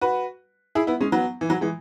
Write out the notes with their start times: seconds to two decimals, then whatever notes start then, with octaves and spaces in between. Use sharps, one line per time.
0.01 F#4 B4
0.75 E4 G#4
0.87 B3 E4
1.00 G#3 C#4
1.12 F#3 B3
1.41 E3
1.50 F#3
1.61 E3 G#3